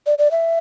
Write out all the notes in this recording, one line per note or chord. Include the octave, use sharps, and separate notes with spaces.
D5
D5
E5